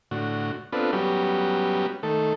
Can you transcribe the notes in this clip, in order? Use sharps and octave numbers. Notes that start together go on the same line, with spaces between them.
A2 D3 F#4
B3 C4 D4 F4 A4 B4
F#3 G3 B3 C#4 G4
D#3 A3 A4